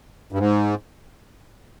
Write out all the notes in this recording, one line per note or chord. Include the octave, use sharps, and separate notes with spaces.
G2
G#2